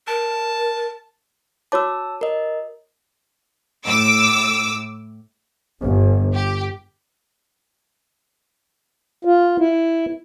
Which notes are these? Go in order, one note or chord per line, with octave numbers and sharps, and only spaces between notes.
A#4 A5
F#4 C#5 A5 D6 E6
A#4 D#5
A2 D6 E6
G1
G4
F4
E4